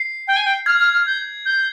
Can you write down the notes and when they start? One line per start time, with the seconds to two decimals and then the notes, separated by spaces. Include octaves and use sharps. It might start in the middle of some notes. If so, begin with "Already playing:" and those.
Already playing: C7
0.28 G5
0.36 G#5
0.45 G5
0.66 F6 G#6
0.79 F6
0.93 F6
1.07 G6
1.46 G6